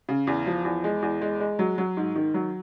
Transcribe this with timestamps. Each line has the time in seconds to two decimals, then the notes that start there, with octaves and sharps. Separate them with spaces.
0.09 C#3
0.27 E2
0.47 F3
0.65 E2
0.84 G#3
1.02 E2
1.21 G#3
1.40 G#3
1.59 F#3
1.78 F#3
1.97 G#2
2.16 D#3
2.34 F#3